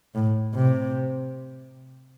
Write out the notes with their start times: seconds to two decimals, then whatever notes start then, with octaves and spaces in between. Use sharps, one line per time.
0.15 A2
0.54 C3